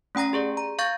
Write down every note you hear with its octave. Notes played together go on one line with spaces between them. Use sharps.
A3 C#4 G5 A#5 A#6
G4 G#4 D5
A#5
F5 C#6 G6 A6